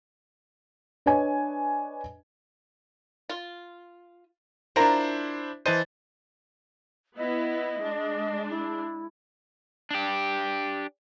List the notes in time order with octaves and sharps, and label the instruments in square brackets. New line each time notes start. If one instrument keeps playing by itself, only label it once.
[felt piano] D4 B4 C#5 D#5 G#5
[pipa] F4
[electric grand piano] D4 E4 C5 [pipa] F4 A#4 A#5
[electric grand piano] E3 C5 [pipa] D#5 A5
[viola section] B3 E4 [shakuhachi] D#5
[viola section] G#3 D4
[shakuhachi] E4
[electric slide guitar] D4 G4